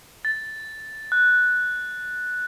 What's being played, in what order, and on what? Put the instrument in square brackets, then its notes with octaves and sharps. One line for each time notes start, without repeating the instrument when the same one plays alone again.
[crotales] A6
F#6